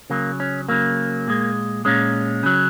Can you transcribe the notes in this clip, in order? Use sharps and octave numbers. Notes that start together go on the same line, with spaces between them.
C#3 F#3 A#3
C#4
C#3 F#3 A#3
A#2 G#3
A#2 G#3 C#4
C#3 F#3